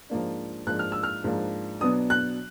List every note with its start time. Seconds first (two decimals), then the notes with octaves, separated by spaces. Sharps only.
0.10 G#2 F3 A#3 D4
0.67 G#2 F3 A#3 D4 F#6
0.79 F6
0.92 E6
1.03 F6
1.24 G#2 F3 A#3 D4
1.81 B2 F#3 B3 D4 D#6
2.10 F#6